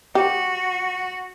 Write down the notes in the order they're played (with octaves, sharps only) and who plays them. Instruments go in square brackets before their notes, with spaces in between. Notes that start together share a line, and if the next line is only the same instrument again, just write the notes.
[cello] F#4 [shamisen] G4